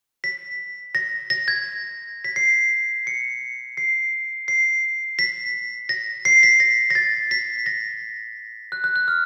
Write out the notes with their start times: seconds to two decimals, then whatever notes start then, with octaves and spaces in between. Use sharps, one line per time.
0.24 B6
0.95 A#6
1.30 A#6
1.48 G#6
2.24 B6
2.36 C7
3.07 C#7
3.77 C7
4.48 C7
5.19 B6
5.89 A#6
6.25 C7
6.43 B6
6.60 A#6
6.90 A#6
6.95 A6
7.31 B6
7.66 A#6
8.72 F#6
8.84 F#6
8.96 F#6
9.08 F6